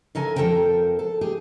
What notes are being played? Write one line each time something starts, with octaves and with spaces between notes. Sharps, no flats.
C#3 A4 A#4 G#5
F2 G3 A4 A#4 C5 G5
A4
G4 G#4